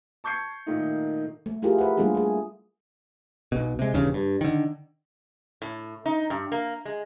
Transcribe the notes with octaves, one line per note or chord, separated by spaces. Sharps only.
A5 C#6 G6 G#6 C7 C#7
A#2 D#3 A3 D#4
A3
A3 E4 F4 G4 G#4 A#4
B4 F#5
G3 A3 A#3 D4 F4 G#4
A3 G#4
B1 B2
C3 G#3
D#1 E2 G2 C#3
G2
D3 D#3
A2
D#4
G2
A#3
G#3